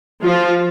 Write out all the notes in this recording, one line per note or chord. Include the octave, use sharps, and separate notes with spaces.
F3 F4